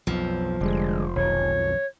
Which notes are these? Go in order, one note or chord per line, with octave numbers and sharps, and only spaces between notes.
B1 F2 F3
F1 D3 G3 G#3
B1 F2 D#3 C#5